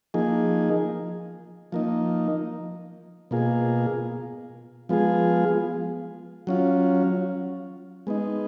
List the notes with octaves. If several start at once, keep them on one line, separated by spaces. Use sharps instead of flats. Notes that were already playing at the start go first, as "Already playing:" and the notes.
F3 A#3 D#4 G#4
F3 A#3 D#4
B2 A#3 F4 G#4
F3 G#3 B3 F4 G#4
F#3 C#4 F4
G#3 B3 D#4